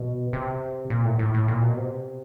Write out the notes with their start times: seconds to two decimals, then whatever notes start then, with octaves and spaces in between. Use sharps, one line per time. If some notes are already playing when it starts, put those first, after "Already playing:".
Already playing: B2
0.33 C3
0.90 A#2
1.05 A2
1.19 A2
1.34 A2
1.48 A#2
1.62 B2
1.77 C3